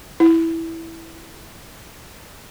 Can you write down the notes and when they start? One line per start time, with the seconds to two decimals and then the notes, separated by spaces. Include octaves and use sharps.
0.20 E4